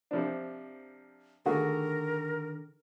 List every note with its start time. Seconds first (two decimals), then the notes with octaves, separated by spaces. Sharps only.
0.11 C3 F3 D4
1.46 D3 D#3 A3 F#4 G#4 A#4